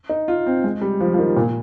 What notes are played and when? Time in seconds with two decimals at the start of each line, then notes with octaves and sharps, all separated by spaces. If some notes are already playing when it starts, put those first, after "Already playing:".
0.09 D#4
0.28 F4
0.46 C4
0.64 G#3
0.81 G3
1.00 F3
1.14 F3
1.19 D#3
1.37 A#2